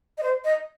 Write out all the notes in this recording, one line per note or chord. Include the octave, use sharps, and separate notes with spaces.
D#5
C5
D#5